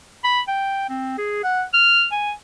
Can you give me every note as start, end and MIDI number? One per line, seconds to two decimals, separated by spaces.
0.24 0.41 83
0.48 0.89 79
0.89 1.18 60
1.18 1.42 68
1.44 1.63 78
1.74 2.06 89
2.12 2.32 80